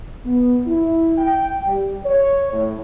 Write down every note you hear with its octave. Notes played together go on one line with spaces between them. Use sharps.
B3
E4
G5
G3
C#5
A2